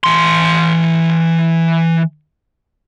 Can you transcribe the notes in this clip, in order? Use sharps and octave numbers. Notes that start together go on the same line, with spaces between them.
E3 C6